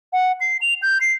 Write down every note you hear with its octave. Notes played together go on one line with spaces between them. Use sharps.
F#5
C7
F7
G6
C7